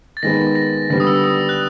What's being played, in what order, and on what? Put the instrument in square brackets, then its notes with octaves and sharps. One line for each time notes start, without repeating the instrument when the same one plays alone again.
[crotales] A6
[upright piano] D#3 G#3 B3 [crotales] A#6
[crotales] A#6
[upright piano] D3 G3 B3 [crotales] A#6
[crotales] D#6
E6
D#6
F#6